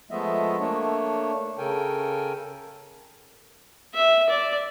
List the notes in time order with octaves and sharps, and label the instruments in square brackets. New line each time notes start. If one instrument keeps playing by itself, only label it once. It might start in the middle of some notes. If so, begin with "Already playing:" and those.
[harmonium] F3 G#3 A3 B3 D#5 E5
A3 A#3 D4 C#5
C#3 A4 A#4 G5 G#5
[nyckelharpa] E5
D5